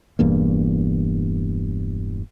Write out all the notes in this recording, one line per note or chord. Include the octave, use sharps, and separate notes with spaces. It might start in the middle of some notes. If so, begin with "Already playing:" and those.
E1 E2 G2 A#3